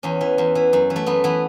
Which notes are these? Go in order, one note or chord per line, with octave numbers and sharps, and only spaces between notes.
E2 C#4
E3
E2
E3
F#2
E3
A3
F#2 B3
E3 B3